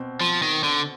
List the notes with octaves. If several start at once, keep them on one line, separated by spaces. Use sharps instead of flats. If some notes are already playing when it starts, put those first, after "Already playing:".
Already playing: B2 C4
F3
D#3
D3